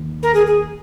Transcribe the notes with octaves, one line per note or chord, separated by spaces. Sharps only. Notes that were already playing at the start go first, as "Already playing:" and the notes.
Already playing: D#2 D#3 A#3
A#4
G#4
G#4